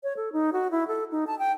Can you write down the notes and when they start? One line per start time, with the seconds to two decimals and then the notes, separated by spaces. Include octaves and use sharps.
0.03 C#5
0.17 A4
0.33 D#4
0.53 F#4
0.71 E4
0.87 A4
1.12 D#4
1.27 A5
1.39 G5